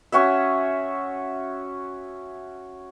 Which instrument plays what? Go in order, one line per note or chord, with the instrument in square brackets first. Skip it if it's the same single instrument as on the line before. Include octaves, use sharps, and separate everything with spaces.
[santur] C#4 F#4 C#5 E5